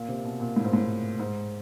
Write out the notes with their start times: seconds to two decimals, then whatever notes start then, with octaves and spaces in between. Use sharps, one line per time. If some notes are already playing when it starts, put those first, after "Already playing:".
Already playing: A#2
0.08 C3
0.25 B2
0.40 A#2
0.56 A2
0.65 G#2
0.73 A2
1.19 G#2